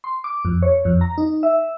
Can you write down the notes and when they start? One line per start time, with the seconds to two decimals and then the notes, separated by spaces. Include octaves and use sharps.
0.04 C6
0.24 D6
0.45 F2
0.62 C#5
0.85 F2
1.01 A#5
1.18 D#4
1.43 E5